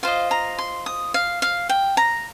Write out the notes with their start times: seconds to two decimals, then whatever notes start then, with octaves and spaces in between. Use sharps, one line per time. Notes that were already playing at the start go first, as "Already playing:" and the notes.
0.03 F4 C5 D#5 F5
0.31 A#5
0.58 C6
0.86 D#6
1.14 F5
1.42 F5
1.69 G5
1.97 A#5